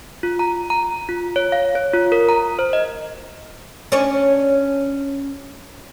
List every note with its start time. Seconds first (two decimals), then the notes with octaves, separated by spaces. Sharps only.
0.23 F4
0.39 A#5
0.70 A#5
1.09 F4
1.36 C#5
1.52 F5
1.75 C#5
1.93 F4
2.12 A#4
2.29 A#5
2.59 C5
2.73 D#5
3.92 C#4 D4 C#5